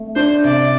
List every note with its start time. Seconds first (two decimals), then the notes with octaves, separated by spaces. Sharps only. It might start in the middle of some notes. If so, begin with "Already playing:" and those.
Already playing: A3
0.16 D4 C5
0.44 C3 D5